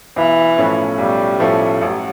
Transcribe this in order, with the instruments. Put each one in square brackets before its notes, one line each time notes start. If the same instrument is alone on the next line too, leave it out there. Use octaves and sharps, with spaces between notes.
[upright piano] B1 [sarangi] E3
[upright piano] A2 F3 A3 C#4
[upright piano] B1 [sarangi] G3
[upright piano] A2 F3 A3 C#4
[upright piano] A1 [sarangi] F#3